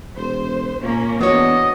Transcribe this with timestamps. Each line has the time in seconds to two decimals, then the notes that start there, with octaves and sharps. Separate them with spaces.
0.16 E1 C5
0.82 A#2 A#3 C#4
1.21 E2 B3 D4 F#4 C#5 D#5